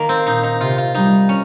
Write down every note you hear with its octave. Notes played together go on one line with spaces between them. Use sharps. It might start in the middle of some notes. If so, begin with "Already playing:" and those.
Already playing: D#3 A#3
C4
A#2 D#4
D#4
C3 F4
F4
G3 D#4
C#4